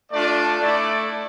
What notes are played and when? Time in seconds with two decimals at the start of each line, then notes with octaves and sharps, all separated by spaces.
0.11 A3 D4 F4 D5
0.61 A3 E4 D5